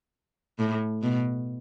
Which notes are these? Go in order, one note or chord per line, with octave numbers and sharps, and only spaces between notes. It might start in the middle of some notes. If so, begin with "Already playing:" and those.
A2
B2